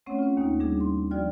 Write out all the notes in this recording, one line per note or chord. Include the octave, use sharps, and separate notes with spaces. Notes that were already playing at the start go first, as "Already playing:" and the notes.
A3 C4 C#4 C#5 F#5
C#4 F4
D#2 A#3 D#4
G3 D4 G#4
C6
F3 F#4 D5 G5 F6